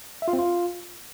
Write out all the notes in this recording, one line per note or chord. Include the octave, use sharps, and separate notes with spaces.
E5
F4
C4
F4